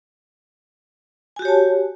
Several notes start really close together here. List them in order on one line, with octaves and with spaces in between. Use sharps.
G#5 F#4 G4 C#5 A5